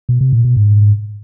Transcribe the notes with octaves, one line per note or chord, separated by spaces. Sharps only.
B2
C3
A#2
B2
G#2